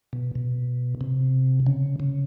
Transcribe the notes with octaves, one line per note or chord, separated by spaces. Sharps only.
B2
B2
C3
C#3
C#3